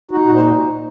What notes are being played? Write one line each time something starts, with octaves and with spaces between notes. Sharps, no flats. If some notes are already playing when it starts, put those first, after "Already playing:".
D#4 F#4
A#2 F#4
C5